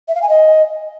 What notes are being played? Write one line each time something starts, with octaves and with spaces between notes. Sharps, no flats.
E5
F5
G#5
D#5